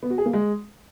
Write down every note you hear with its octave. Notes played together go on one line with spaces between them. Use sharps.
B3
F#4
G#4
A#3
G#3